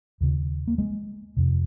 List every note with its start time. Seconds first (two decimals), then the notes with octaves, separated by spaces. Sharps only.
0.21 D#2 C#3
0.68 A#3
0.78 G#3
1.36 F2 C3